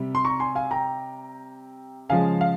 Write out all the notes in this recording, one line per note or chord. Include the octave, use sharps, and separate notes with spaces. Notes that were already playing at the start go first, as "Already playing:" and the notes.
Already playing: C3 G3
C6
A#5 C#6
G#5 C6
F5 G#5
G5 A#5
C#3 F3 G#3 F5 G#5
F5